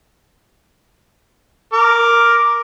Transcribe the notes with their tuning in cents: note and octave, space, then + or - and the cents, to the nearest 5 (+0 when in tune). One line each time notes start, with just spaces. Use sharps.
A#4 +0 D6 +0